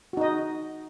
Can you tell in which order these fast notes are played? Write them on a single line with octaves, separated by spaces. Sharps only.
F#4 D#4 D#5